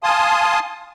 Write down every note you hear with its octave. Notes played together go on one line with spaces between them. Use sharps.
F5 G#5 A5 C6 D#6